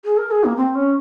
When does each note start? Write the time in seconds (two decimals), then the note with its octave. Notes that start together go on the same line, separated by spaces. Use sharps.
0.04 G#4
0.18 A#4
0.31 G#4
0.44 A#3
0.57 C4
0.75 C#4